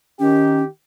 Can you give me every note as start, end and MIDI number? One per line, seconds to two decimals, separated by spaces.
0.20 0.65 51
0.20 0.63 61
0.20 0.65 67